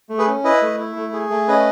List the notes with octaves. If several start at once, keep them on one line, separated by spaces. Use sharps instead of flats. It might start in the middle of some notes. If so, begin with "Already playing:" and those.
A3
G#4 B4
C#4
E4 B4 D#5
A3
E4
A3
G#4
A3
C#4 B4 D#5